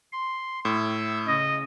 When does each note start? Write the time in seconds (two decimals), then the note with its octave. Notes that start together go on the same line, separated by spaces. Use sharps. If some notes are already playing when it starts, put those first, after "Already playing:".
0.12 C6
0.65 A2 E6
1.27 C#3 D#5